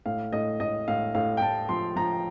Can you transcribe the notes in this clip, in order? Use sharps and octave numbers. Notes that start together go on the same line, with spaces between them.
A2 F5
A2 D#5
A2 D#5
A2 F5
A2 F5
G5
A2 A5
F3 C6
F3 A#5